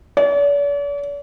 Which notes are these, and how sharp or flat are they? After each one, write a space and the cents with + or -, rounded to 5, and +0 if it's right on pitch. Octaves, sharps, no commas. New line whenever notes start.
D5 -45